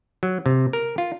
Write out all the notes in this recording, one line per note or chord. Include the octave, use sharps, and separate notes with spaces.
F#3
C3
A#4
F4